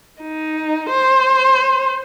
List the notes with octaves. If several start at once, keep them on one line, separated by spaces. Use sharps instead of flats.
D#4
C5